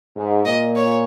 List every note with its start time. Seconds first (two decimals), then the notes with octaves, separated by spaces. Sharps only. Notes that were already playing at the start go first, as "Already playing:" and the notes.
0.15 G#2
0.45 A#2 D#5
0.76 C#5